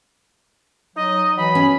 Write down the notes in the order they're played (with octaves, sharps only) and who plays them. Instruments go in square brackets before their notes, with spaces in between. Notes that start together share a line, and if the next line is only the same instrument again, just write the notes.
[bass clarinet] F#3 [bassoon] D#4 [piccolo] D#5
[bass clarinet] E3 [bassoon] F#3 [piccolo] B5
[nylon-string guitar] C#4